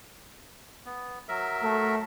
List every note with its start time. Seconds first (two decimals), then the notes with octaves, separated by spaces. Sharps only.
0.86 B3
1.29 F#3 A#4 E5
1.63 A3